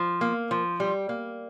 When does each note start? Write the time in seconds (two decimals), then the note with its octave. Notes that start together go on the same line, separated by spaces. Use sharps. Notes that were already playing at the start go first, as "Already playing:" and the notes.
Already playing: F3
0.21 A#3
0.51 F3
0.80 G3
1.09 A#3